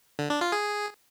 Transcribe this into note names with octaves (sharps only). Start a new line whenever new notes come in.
D3
D4
F4
G#4